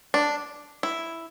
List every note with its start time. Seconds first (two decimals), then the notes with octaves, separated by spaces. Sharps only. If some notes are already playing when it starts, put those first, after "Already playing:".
0.14 D4
0.83 E4